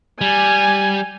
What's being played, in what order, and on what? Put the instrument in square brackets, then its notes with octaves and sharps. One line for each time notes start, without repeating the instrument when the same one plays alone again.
[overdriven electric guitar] G3 [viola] G#5